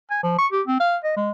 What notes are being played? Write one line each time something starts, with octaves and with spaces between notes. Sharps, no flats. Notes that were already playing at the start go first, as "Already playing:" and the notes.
G#5
F3
C#6
G4
C4
F5
D#5
G#3